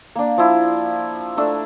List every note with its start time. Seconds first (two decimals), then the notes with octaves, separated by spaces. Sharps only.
0.15 A#3 D4
0.38 F3 E4
1.37 A3 D4 E6